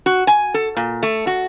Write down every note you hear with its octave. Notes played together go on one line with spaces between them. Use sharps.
F#4
G#5
A4
A#2
A3
F#4